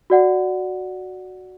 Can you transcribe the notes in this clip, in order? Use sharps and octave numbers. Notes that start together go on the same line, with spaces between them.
F#4 D5 F#5